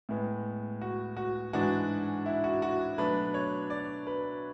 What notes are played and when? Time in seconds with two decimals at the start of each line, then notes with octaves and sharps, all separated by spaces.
0.09 A2 G#3 B3
0.81 F#4
1.17 F#4
1.53 G#2 E3 G#3 D4 F#4
2.26 E4
2.44 F#4
2.62 F#4
2.98 B2 F#3 A3 D4 B4
3.34 C#5
3.70 D5
4.07 B4